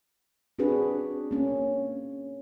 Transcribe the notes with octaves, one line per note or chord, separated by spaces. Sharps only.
C4 D4 F#4 G#4 B4
A#3 C#4